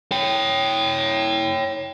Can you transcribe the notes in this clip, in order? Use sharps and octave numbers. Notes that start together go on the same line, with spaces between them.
C#5 G5